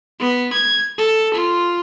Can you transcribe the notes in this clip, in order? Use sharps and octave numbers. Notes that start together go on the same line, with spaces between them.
B3
G#6
A4
F4